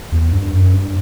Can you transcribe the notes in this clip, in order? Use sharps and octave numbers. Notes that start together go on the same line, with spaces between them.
E2
G2
F#2
G2